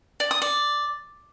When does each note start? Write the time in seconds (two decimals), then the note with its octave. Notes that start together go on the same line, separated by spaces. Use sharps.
0.20 D5
0.31 D#6
0.42 D5